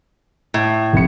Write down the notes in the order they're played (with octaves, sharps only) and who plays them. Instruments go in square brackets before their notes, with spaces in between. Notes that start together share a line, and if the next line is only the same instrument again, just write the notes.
[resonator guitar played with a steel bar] A2
[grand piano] F1 C#7